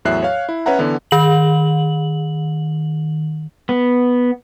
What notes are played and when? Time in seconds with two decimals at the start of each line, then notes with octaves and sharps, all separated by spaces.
0.05 E2 A2 F#3 E5 F#6 C7
0.23 C#5 F5
0.49 E4
0.66 C#4 B4 C#5 E5 F#5 A#5
0.79 D3 E3 B3
1.11 D#3 F#7
3.69 B3